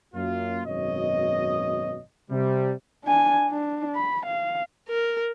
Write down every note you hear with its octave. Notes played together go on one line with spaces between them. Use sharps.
F#2 A#3 F4
G#1 F#2 B2 C#5 D#5
C3 G3
D4 G#5
D4
B5
F5
A#4